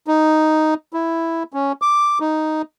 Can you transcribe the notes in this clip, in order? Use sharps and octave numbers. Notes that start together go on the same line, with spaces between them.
D#4
E4
C#4
D6
D#4